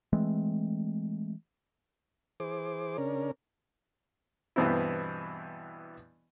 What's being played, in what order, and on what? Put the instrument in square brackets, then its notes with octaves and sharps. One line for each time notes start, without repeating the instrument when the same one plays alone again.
[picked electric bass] E3 G#3 A3 C4
[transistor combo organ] E3 G#4 C5 D6
C#3 C#4 D4 A#4
[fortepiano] G2 B2 E3 B3 C4 E4